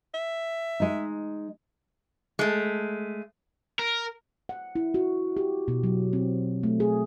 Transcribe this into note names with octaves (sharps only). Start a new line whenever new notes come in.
E5
G#3 D#4
G#3 A3
A#4
F#5
E4
F#4
G4
B2
F#3
C4
A3
G#4